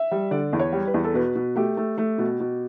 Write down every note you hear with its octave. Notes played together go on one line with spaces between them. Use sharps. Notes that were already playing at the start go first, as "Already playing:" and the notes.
Already playing: E5
G3
D3 D5
E2
C#5
G3
B4
E2
A4
B2 B4
B2
A3 G4
A3
A3
B2
B2